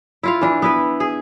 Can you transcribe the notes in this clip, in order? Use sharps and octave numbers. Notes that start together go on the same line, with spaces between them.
E4 F4 F5
E3 D4
B3 E4 B4
G#4